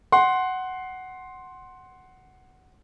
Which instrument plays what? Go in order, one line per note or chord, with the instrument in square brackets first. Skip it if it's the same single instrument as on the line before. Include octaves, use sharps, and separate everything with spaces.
[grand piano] F#5 C6